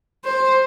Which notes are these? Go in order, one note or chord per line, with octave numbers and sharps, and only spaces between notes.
C5